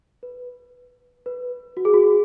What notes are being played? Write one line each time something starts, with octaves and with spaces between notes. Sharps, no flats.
B4
B4
F#4
G#4
F#4